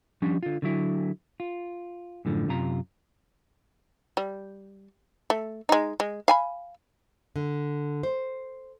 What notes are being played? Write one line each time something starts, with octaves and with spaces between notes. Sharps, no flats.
F3 G3 C#4 D4
D3 F4
D3 F#3 E4
F4
F#2 A2 D3 F3
F#2 C3 F4 A#5
G3
A3
G#3 D#4
G#3
F5 G#5 B5
D3
C5